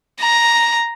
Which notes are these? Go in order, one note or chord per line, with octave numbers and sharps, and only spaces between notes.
A#5